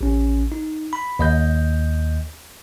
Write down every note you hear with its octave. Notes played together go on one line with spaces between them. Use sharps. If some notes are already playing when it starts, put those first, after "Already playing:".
A1 C#4
D#4
B5
D#2 D#5 G6